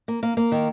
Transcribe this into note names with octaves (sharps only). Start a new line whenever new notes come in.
A#3
A#3
A#3
D#3